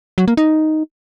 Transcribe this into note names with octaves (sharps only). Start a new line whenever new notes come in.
F#3
A#3
D#4